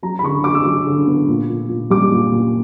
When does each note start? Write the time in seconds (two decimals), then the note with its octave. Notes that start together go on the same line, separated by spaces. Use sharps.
0.03 F#3 A#5
0.19 B5
0.23 D3 C#6
0.44 F#3 D6
0.55 E6
0.64 F#3 D6
0.86 D3
1.07 B3
1.28 A#2
1.50 A#2
1.69 A#2
1.90 G3 D6
2.12 A#2
2.32 A#2